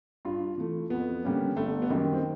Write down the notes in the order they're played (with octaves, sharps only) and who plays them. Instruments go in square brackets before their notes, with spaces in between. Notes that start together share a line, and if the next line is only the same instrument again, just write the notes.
[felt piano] G2 [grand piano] F4
[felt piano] E3 A3
[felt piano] F2 [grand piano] B3
[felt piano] D3 G3 A#3 C#4
[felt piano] G1 [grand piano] A3
[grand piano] B3
[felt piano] F#2 D#3 G3 [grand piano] A#3
[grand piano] C4